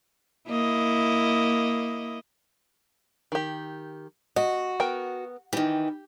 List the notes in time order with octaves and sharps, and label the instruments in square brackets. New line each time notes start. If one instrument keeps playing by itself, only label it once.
[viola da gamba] A#3 E4 D#5
[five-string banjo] D#3 G4
[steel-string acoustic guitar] F#4 [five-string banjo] D#5
[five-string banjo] B3 A#4 G5
[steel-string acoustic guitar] D#3 E3 [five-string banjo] G4